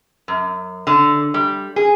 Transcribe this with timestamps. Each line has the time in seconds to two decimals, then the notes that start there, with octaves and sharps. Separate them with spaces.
0.28 F#2
0.87 D3
1.34 G3
1.76 G#4